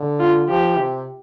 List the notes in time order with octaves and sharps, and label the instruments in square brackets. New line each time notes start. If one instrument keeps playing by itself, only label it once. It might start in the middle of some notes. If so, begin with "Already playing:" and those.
Already playing: [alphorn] D3
[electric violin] F4
[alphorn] F3 [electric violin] G4
[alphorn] C3